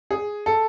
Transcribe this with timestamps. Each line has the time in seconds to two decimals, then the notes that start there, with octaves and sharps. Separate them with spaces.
0.11 G#4
0.46 A4